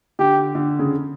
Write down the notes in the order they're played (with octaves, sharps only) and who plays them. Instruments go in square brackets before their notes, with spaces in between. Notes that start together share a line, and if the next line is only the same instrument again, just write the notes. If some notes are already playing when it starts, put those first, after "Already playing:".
[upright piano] D3 [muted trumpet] G4
[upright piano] D3
C#3